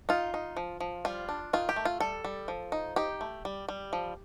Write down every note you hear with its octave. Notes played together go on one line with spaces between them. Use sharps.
D#4 F4
D#4
F3
F3
G3 F4
D4
D#3 F4
G4
A3
F4
G3 A4
G3
F3
D#4
D#4 G4
A3
G3
G3
F3